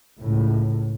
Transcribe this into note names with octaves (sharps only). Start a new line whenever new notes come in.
C#2 A2